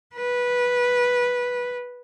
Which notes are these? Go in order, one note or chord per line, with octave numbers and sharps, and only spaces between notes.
B4